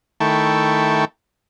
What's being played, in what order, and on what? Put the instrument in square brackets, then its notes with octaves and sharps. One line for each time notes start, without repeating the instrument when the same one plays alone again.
[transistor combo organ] D#3 A3 E4 G5 A5 C#6